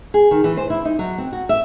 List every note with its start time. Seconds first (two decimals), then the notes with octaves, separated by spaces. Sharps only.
0.14 G#4
0.31 D#3
0.44 E3
0.57 C5
0.70 E4
0.85 D#4
0.99 F#3
1.18 C4
1.33 F#4
1.49 E5